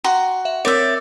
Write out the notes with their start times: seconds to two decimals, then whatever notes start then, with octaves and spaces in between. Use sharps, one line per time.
0.04 F#4 G5 A#5 C6
0.45 E5 F#5
0.65 C4 A#4 C#5 D5 E5